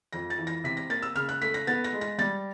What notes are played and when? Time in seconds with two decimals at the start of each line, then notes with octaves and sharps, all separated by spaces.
0.13 F2 A#6
0.30 A6
0.38 E3
0.47 A#6
0.64 C3 B6
0.77 A#6
0.90 A#3 A6
1.02 E6
1.15 C#3 F6
1.29 F#6
1.42 A3 B6
1.54 A#6
1.67 B3 A6
1.84 A#6
1.93 G#3
2.01 A#6
2.18 G3 A6